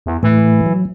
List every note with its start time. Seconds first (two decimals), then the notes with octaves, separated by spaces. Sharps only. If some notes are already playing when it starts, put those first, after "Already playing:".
0.06 E2
0.23 A2 E3 A3
0.66 F#3